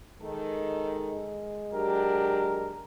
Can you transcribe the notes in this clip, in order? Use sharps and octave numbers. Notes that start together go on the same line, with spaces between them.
D#3 G#3 A4
F#3 D4 G4 A#4